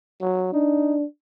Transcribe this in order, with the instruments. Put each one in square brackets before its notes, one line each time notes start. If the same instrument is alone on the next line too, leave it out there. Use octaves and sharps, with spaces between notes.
[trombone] F#3
[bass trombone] D4 [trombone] D#4